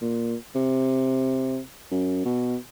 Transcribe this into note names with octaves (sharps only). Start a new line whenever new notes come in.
A#2
C3
F#2
B2